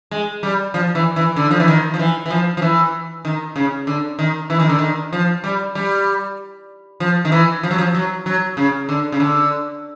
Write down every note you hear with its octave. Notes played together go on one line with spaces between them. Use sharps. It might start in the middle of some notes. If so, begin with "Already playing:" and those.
G#3
G3
F3
E3
E3
D3
F3
E3
D#3
F3
E3
E3
F3
F3
E3
D#3
C#3
D3
D#3
E3
D#3
D3
D#3
F3
G3
G3
F3
D#3
E3
F3
F#3
F3
F#3
F#3
C#3
D3
C#3
D3